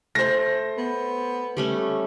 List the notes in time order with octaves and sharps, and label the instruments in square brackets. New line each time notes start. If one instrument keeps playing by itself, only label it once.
[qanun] A3 [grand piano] C5 A#6
[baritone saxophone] B3
[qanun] G3 A3 C#4